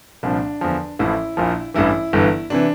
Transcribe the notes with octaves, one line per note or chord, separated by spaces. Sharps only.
C2 A#2 F3 D4
E2 D3 F3
A1 A2 F3 E4
A#1 A#2 F3
A1 G2 E3 E4
G1 G2 E3
C3 E3 D4